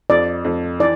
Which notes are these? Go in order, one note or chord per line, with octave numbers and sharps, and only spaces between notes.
F2 D5
F2
E3 D5